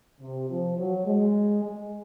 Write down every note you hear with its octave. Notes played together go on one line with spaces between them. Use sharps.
C3
F3
F#3
G#3
G#3